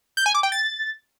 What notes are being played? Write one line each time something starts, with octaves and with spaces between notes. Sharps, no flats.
G6
G#5
D6
G5
A6